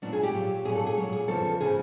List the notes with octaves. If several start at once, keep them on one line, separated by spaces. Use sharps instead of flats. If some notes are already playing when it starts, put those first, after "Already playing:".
A#2 F#3 D4
G#4
G4
A#2 F#3
A#2 F#3 G#4
A4
G#4
A#2 F#3
G#4
E2 C#3 F3 A4
C#3 F3 G#4